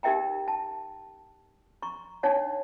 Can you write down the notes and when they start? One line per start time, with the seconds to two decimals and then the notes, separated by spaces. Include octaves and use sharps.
0.03 D#4 G4 A#4 E5 G5 A#5
0.48 A5
1.82 A#5 C#6
2.23 D4 D#4 C#5 F#5 A5